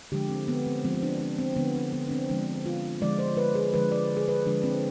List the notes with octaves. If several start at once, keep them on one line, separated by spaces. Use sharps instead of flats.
D3 F3 G#3 G4
C4
B3
C4
D3 F3 G#3 C4
C4
D4
D4
C4
D3 F3 G#3 B3
C4
B3
D4
C4
D3 F3 G#3 D4
F4
D3 F3 G#3 D5
C5
B4
G#4
D3 F3 G#3 B4
D5
G#4
B4
D3 F3 G#3 D4
C4